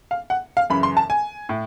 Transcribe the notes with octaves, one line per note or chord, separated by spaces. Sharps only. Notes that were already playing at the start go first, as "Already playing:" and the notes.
F5
F#5
F5
F#2 C#3 E3 B5
C6
A5
G#5
A2